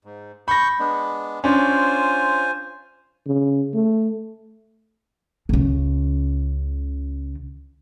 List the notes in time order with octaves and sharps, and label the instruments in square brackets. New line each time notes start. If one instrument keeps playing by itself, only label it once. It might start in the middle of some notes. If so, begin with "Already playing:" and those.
[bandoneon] G#2
[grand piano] B5 A#6 [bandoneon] C#6 G6
[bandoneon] G#3 B3 D4
[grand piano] C#4 D4 [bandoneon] F4 C5 G#5
[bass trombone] C#3
A3
[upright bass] C#2 C#3